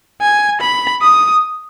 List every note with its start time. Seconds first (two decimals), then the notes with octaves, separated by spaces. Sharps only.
0.21 G#5
0.61 B5
1.02 D#6